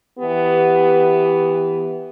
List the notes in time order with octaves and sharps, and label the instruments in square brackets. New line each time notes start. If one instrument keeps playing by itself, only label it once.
[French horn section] E3 B3 G4